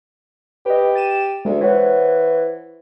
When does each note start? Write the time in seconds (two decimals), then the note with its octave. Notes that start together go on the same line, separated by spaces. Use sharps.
0.66 G4 B4 D#5
0.95 A6 D#7 E7
1.45 D2 G#3
1.61 E3 C5 C#5 F#5